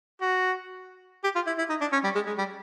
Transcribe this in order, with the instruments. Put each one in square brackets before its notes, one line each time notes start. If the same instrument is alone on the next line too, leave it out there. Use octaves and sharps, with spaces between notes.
[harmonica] F#4
G4
F4
E4
E4
D#4
D4
C#4
G3
G#3
G#3
G3